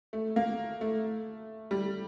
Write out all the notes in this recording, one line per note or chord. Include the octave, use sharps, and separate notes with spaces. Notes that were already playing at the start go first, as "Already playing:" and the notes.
A3
A#3
A3
G3